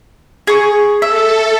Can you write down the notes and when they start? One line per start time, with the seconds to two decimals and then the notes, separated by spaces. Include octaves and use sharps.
0.47 G#4 C#6
1.02 A4 E5